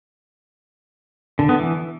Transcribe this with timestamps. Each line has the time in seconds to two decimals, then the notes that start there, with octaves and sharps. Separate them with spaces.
1.39 D3
1.49 B3
1.59 E3